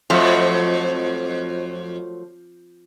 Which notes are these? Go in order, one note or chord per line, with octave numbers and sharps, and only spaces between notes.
F2 F3 F#3 A3